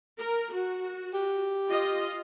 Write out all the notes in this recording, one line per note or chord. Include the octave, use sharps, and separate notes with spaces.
A#4
F#4
G4
F4 D#5